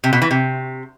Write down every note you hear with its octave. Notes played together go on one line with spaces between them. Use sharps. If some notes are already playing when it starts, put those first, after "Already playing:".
C3
B2
E3
C3